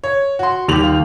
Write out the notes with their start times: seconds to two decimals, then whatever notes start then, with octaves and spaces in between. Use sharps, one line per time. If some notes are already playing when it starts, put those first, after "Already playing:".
0.04 C#5
0.39 F#4 C6
0.68 D#2 G3 G4 F7 F#7
0.83 F4